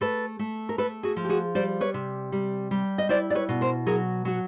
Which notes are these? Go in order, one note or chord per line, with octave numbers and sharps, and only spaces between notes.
A3 A4 B4
A3
A#4
A3 A4 B4
F#4 G#4
F3
G4
F#4 G#4
G3 C5 D5
B4 C#5
C3
G3
G3
D#5
E4 C5 D5
D5
B4 C#5
B2
A#4 C5
F#3 G#4 A#4
F#3 F#4